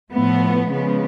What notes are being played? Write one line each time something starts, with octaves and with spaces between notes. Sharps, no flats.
A2 F3 A3 B3
C#3 F3 G#3 B3